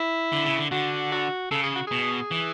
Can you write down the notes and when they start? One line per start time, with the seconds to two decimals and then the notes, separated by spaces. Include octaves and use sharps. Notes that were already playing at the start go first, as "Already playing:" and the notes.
Already playing: E4
0.32 D3
0.45 C#3
0.57 D3
0.71 D3 F#4
1.12 F#4
1.51 C#3 A4
1.63 G#4
1.75 F#4
1.87 B2 G#4
2.31 E3